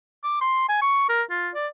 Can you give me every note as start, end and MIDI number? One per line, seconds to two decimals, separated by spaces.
0.24 0.41 86
0.41 0.67 84
0.69 0.78 80
0.82 1.06 85
1.09 1.22 70
1.30 1.50 65
1.55 1.67 74